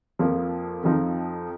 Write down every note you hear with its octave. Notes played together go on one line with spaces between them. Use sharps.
F2 F3 A#3
F2 F3 D#4